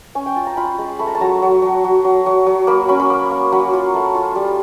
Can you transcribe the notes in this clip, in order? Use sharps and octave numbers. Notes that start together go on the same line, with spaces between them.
C#4 G#5
G5
F4 A5
A#5
F4 B5
G#3
A3 B5
A#5
A5
F#3 A#5
F#3
F#3
F#3
F#3
F#3
F#3
A#3 B5
C#4 B5
B5
A#3
A#3
F#3 B5
F4
A3
F4
G3